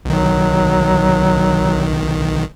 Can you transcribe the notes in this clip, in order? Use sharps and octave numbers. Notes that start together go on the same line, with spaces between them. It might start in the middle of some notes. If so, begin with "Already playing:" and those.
B1 D#3 F#3